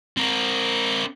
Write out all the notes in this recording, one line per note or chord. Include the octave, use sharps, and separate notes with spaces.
C4 A#4